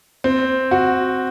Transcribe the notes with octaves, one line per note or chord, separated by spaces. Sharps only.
C4
F#4